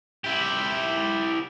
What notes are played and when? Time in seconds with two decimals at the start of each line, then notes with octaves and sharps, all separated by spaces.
0.24 E4 G4